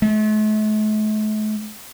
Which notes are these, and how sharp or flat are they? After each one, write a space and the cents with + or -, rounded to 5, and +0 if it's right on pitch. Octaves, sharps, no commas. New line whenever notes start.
A3 -45